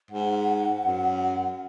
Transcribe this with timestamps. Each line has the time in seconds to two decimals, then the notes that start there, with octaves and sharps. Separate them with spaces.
0.11 G#2 F#5
0.86 F#2